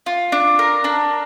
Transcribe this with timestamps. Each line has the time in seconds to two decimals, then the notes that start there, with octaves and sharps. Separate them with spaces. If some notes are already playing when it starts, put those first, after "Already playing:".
0.06 F4
0.32 D4
0.59 A#4
0.84 D4